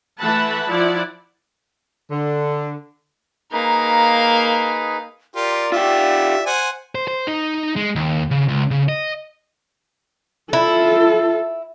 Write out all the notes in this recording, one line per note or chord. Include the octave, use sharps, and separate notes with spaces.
E3 A3 E5 F#5 A5 B5
F3 E4 D5 F#5
D3
A#3 D#4 G#4 B4 F5 A#5
F4 G4 A#4 D5
F4 G4 E5
C5 F#5 G#5
C5
C5
D#4
G#3
D#2
C#3
C#2
C#3
D#5
E4 F4 A4